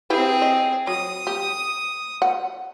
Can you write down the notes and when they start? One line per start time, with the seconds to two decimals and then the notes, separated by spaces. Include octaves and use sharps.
0.10 C4 E4 G4 G#4 B4
0.42 D#5
0.87 F#3 D#6
1.27 G4
2.22 F#5